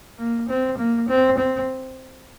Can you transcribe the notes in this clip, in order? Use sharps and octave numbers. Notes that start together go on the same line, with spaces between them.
A#3
C4
A#3
C4
C4